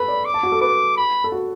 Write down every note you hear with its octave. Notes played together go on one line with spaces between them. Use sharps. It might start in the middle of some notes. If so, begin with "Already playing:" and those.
Already playing: A4 B4 B5
D5
D6
A5
F#4
A4
B4 D6
B5
A4
F#4